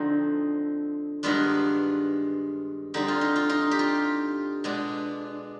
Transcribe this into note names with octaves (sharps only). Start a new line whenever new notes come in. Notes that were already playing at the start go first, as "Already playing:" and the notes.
Already playing: D3 F3 C4 D#4
G2 D#3 G#3 B3 D4 F4
D3 G3 C4 D#4
F4
D#4
F4
D#4
G4
F4
B2 G#3 D4